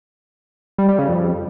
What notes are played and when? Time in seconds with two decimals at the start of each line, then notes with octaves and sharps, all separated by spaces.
0.78 G3
0.89 G3
0.99 C#3
1.09 F2